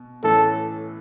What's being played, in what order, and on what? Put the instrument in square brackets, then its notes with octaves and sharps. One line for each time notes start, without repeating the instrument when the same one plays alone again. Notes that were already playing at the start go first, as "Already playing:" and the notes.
Already playing: [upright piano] B2
[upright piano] A2 E3 A3 C#4 [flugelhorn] A4